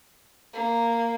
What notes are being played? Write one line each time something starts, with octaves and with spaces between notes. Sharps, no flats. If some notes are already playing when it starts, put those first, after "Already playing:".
A#3